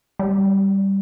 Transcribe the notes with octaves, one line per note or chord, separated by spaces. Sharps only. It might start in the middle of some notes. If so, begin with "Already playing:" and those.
G3